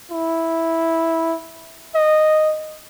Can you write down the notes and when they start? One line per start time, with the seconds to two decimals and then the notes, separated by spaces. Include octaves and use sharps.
0.11 E4
1.95 D#5